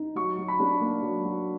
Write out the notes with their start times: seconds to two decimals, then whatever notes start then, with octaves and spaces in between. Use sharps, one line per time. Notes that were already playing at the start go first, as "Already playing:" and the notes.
Already playing: D#4
0.15 F#3 C#6
0.38 F#3
0.48 B5
0.60 D4
0.81 A#3
1.02 F#3
1.25 F#3